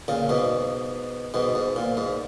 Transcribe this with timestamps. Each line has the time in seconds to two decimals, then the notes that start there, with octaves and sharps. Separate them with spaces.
0.08 A#2 C#3
0.29 G#2 B2
1.34 G#2 B2
1.55 G#2
1.76 A#2
1.97 G#2